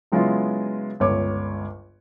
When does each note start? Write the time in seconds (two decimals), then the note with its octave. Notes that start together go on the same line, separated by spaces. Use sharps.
0.12 C#3 F#3 G#3 B3 E4 F4
1.00 G1 C#2 C#5 D6